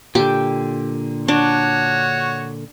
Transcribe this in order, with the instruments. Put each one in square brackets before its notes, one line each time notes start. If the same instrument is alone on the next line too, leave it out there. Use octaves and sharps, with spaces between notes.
[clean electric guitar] A#2 D3 [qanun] G4
[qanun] D4 [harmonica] F#4 C#5